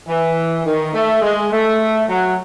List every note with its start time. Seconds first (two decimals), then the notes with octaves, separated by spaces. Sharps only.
0.08 E3
0.66 D#3
0.94 A3
1.22 G#3
1.51 A3
2.09 F#3